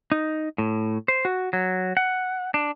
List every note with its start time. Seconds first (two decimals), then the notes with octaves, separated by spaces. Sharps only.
0.12 D#4
0.58 A2
1.08 C5
1.25 F#4
1.53 F#3
1.97 F#5
2.54 D4